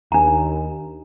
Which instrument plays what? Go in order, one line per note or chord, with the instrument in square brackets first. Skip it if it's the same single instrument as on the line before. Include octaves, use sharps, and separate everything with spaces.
[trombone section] D#2 [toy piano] D4 A#5